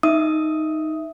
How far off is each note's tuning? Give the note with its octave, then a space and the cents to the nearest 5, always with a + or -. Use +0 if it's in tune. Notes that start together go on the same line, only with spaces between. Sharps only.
D#4 +0 E5 +0 D#6 +10